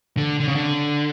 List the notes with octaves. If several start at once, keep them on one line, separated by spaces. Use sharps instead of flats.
D3
D3
C#3
D3